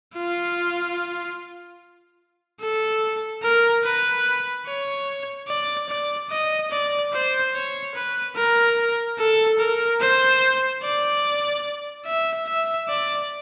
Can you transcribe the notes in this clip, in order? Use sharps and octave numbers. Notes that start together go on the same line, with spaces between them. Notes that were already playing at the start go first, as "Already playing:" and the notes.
F4
A4
A#4
B4
C#5
D5
D5
D#5
D5
C5
C#5
B4
A#4
A4
A#4
C5
D5
E5
E5
D5